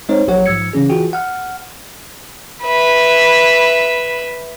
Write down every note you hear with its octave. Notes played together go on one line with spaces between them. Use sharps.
G#3 C4 D#4 C5 C#5
A#1 F#3 G4 C#5 F#5
G#2 F3 E6 G#6 C#7
C#3 E3 C#4 G#4
E3 F4 F#4 G#4 G5
F#5 F6
B4 E5